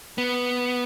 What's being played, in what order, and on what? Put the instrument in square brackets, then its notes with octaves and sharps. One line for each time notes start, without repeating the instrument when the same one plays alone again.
[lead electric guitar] B3